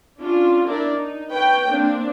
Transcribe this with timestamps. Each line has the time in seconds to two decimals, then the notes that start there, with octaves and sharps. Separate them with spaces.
0.20 C#4 D4 F4
0.66 D4 E4 A#4 D5
0.96 D#4
1.32 B4 C#5 G5
1.69 A#3 C4 D4